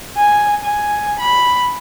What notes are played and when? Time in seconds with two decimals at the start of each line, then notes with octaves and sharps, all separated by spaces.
0.18 G#5
0.63 G#5
1.20 B5